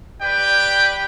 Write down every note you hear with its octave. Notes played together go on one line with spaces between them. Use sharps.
G4 B4 D5 G5